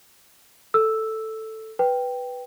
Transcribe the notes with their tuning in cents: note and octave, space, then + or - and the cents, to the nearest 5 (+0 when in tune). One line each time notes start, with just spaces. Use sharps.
A4 +5 E6 +0
B4 +0 G5 +0